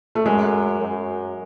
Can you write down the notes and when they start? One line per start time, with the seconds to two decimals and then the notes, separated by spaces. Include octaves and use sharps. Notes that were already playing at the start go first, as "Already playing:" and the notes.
0.15 A3
0.26 F#2 G#3
0.80 F#2